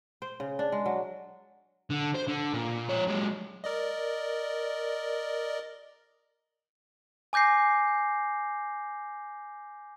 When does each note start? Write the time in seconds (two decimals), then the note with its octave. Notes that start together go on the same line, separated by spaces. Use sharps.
0.22 C5
0.40 C#3
0.59 D4
0.72 G#3
0.86 F#3
1.90 D3
2.15 C5
2.28 D3
2.54 A#2
2.89 F3 C#5
3.07 F#3 G#3
3.64 A#4 D5 D#5
7.33 G#5 D6 G6 A#6 C7